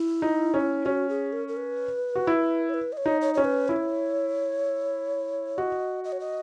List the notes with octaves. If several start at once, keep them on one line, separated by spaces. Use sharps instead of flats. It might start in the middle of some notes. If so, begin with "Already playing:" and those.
Already playing: E4
D#4
C#4
C#4 F#4
G#4
A#4
A#4
B4
F#4
E4
C#5
B4
D#5
C#5
D#4
C#5
C#4 C#5
B4
E4 C#5
F#4 D#5
D#5
C#5
D#5